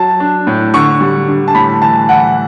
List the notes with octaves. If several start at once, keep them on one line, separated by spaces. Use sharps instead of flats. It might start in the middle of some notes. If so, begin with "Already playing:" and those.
Already playing: F#3 A5
D4
A2
D3 C#6
G3
D3
A5
A2 B5
E3 A5
E3 F#5